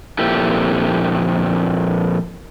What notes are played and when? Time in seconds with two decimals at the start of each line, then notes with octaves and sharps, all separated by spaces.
0.19 F2 A#2 E4 G4